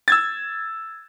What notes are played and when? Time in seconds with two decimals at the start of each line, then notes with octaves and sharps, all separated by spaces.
0.08 E6 G#6 A6